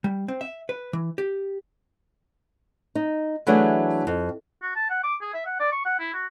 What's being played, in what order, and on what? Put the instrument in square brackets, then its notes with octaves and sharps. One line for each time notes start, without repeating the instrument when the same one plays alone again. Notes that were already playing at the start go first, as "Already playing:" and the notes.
[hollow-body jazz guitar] G3
C4
E5
B4
E3
G4
[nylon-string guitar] D#4
E3 F#3 A3 D4 G#4
F2
[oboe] F#4
A5
F#5
D6
G#4
E5
F#5
D5
C#6
F#5
E4
F#4